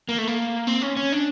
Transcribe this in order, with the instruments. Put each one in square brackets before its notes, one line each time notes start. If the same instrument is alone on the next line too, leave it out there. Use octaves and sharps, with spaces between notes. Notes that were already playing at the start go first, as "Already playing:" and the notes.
[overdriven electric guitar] A#3
A3
A#3
C4
C#4
C#4
D4